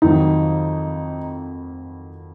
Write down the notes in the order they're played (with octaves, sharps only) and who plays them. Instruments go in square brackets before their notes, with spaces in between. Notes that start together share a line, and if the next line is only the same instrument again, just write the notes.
[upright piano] F2 D#3 F#3 [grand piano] D#4